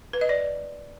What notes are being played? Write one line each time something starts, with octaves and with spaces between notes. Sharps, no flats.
B4
D#5
D5